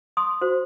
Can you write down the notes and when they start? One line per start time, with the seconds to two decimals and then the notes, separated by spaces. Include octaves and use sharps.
0.17 C6 D#6
0.41 F#4 C5